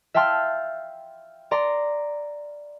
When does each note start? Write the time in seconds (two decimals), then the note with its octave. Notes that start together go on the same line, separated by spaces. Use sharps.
0.14 E5 F5 G5 A5 C6 F6
1.51 D5 A#5 C6